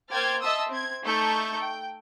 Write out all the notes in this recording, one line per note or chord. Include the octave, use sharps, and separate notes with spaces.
A#3 C5 G5 F6 G#6 A6
D#5 E5 A5 C6 D#6 E6
C4 G#6
A3 D#4 A4 A5 C#6 G6
G5